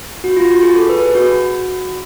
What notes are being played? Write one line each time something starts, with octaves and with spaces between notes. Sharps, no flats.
F#4
F4
F#4
G#4
A4
B4
G#4
F#4